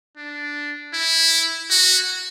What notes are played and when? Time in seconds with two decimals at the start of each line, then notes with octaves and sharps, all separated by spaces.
0.18 D4
0.94 E4
1.71 F#4